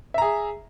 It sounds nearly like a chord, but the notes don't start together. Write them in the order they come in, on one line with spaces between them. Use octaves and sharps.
E5 A#5 G#4